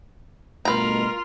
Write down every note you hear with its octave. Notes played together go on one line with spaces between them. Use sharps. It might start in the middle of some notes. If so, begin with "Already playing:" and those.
G2 B2 A3 F4 A#4 B4 A#5